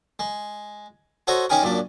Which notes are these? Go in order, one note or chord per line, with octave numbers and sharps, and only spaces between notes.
G#3
F#4 A4 C5 C#5 D#5
C#4 D#4 G4 G#4 A#4
F#2 A#2 D4